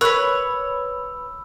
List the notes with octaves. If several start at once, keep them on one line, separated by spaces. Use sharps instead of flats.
A#4 B4 C#5 B5 E6 F#6